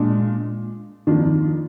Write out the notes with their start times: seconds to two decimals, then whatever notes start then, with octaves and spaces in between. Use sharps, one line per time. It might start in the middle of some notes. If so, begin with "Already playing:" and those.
Already playing: A#2 G#3 D4 F4
1.07 F2 D#3 A#3 D4 F4